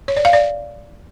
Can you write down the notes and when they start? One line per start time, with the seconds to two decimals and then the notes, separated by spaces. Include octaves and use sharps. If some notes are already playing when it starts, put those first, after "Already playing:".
0.08 C#5
0.16 D5
0.25 F5
0.33 D5